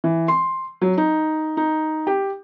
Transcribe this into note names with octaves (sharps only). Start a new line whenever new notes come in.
E3
C6
F#3
D#4
D#4
G4